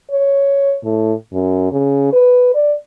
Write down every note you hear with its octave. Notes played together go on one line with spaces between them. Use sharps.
C#5
A2
F#2
C#3
B4
D5